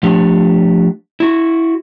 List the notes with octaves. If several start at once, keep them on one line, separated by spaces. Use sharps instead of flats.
F3 A3 D4 G4
E4 F#4